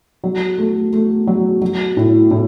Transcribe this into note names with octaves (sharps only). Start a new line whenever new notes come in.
F#3
A3
A3
F#3
F#3
A2
A2